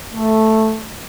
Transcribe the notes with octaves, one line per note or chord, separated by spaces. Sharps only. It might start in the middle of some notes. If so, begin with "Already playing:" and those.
A3